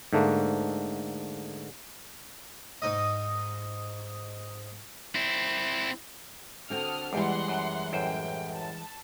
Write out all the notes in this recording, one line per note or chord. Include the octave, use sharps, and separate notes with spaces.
G#2 D3 A3 A#3
G#2 D#4 D#5
C4 E4
D3 C4 F#4 A4 D#6 F6
E2 E3 G3 G#3 F#5 C6
F#2
A1 F#2 C5 G5
A5